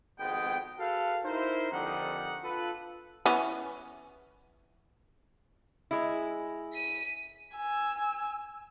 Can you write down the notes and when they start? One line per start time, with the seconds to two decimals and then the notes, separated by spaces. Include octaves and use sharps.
0.19 G#1 F2 G#3 B3 G5
0.79 F#4 G#4 A4 B4 F5
1.24 D#4 E4 A#4 C5
1.71 F2 D3 D#3 G3 D#4 F#5
2.43 F4 A4 B4
3.26 E3 B3 C#4
5.91 G#3 E4
6.73 B6 D#7
7.56 G#5 E6